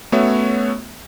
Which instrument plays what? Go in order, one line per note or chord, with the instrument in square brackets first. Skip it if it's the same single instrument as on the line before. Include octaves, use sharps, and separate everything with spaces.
[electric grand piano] A3 B3 C#4 F#4 C#5 E5